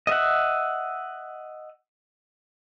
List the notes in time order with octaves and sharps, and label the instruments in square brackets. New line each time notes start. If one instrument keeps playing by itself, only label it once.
[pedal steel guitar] D#5 E5 F#5